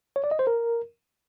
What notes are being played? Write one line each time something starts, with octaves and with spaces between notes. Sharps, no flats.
C#5
D5
D#5
C5
A#4